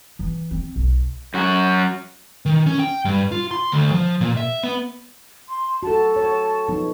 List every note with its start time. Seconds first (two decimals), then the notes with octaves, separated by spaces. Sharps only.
0.19 E3
0.51 C4
0.76 B1
1.34 F#2 F#4
2.46 D#3
2.67 C#4
2.79 G5
3.05 G2
3.32 F4
3.51 C6
3.72 D2
3.92 F3
4.21 A#2
4.37 E5
4.63 B3
5.49 C6
5.83 F#4 A4 A5
6.16 C#5
6.68 F3 B3 D#4